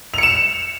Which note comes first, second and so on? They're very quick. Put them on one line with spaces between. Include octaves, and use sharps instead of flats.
F7 C#7 E7